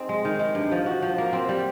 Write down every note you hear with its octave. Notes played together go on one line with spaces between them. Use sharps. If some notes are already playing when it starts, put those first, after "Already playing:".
Already playing: C4 D#4 G#4
G#3
D#3
G#3
G2
F3
F#4
F3
A#3
C4
G3